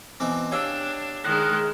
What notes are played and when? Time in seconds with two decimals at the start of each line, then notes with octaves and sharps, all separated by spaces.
0.20 B2 E3 C4 D6
0.52 D4 G4 C#5 F5 E6
1.24 D#3 G#3 F#6